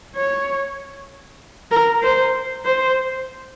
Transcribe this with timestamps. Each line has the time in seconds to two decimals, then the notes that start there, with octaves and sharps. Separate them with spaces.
0.16 C#5
1.71 A#4
2.02 C5
2.65 C5